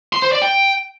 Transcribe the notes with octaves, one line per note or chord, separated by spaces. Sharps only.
C6
C5
D5
G5